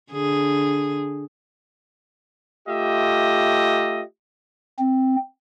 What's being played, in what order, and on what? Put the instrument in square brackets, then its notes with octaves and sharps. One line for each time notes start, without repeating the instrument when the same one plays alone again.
[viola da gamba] D3 G#4
[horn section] A3 F4 G4 D#5 E5
[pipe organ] C4